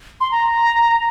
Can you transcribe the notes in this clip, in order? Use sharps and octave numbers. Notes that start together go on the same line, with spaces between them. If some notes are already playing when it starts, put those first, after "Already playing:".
C6
A#5